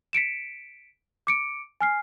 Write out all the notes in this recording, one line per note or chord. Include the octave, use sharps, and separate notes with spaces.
B6 C#7 D7 E7
D6 C#7 D7
G#5 F6 C7